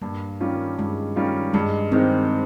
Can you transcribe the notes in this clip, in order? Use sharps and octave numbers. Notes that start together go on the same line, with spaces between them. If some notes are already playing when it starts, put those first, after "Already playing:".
G2 A#3
D#3 G3 C#4 F4
G2 G#3
D#3 G3 C#4 F4
G2 G#3
D#3 G#3 C4 D#4